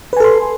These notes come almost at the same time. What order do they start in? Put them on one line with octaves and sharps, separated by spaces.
B4 G#5 A4 C6